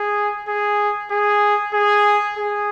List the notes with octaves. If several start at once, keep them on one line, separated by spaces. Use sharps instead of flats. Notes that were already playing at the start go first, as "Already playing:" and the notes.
Already playing: G#4
G#4
G#4
G#4
G#4